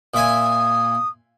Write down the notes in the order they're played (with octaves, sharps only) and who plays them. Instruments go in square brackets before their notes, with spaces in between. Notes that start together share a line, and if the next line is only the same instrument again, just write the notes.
[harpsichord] A#2 E5 G#5 [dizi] D#6